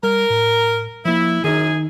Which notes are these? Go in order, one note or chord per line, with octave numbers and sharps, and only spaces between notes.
G3 A#4
A2
F3 A#3 E4
F#2 D#3 D#4 G#4